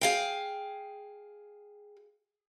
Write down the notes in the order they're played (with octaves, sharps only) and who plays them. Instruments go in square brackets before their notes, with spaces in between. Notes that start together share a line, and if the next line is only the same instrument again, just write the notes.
[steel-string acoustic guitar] G#4 F5 G5